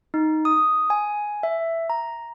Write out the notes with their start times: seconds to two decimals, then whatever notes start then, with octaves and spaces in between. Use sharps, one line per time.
0.14 D#4
0.45 D#6
0.90 G#5
1.43 E5
1.90 A#5